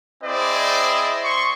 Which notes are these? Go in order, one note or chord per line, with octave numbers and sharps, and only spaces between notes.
C4 E4 G#4 C5 D5 D#5
C6 C#6